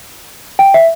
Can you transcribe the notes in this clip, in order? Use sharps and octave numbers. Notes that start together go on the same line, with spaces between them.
G5
E5